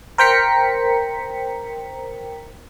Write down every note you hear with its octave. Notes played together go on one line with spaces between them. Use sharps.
A#4 C5 G5 A#5 B6 C#7